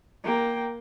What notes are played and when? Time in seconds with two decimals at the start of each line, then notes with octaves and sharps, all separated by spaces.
0.23 A#3 G5